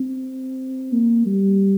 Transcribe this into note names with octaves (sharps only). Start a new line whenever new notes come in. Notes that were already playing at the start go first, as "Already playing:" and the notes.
Already playing: C4
A#3
G3